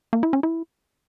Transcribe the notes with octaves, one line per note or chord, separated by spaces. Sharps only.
A#3
E4
C#4
E4